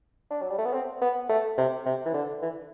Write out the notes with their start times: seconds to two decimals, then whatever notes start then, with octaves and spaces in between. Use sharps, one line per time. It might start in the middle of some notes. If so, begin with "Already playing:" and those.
0.30 D4
0.42 F#3
0.50 G3
0.58 A3
0.65 B3
0.73 C4
1.01 B3
1.29 A3
1.58 C3
1.86 C3
2.05 E3
2.14 D3
2.42 E3